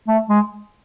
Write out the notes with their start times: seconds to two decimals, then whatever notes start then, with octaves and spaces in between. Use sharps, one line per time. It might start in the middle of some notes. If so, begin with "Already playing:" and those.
0.08 A3
0.29 G#3